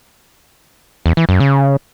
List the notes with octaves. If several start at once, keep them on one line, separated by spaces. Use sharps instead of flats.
E2
E3
F#2
C#3